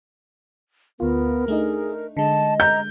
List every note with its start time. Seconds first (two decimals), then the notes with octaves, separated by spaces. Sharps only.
1.00 D2 B3 F4 A#4
1.48 A3 D4 D#4 G#4
2.17 D3 G#3 D#5 A5
2.60 A#5 G6